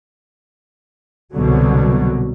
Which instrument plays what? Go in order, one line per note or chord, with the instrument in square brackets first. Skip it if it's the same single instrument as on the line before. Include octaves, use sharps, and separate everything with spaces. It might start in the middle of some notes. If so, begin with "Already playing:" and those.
[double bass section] C2 B2 D3 F#3